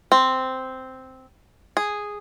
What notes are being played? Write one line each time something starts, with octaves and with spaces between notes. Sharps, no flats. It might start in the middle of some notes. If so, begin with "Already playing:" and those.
C4
G#4